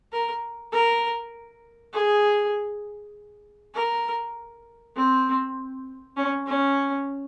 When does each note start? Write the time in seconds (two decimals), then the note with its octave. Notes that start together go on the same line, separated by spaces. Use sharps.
0.12 A#4
0.72 A#4
1.93 G#4
3.74 A#4
4.96 C4
6.17 C#4
6.47 C#4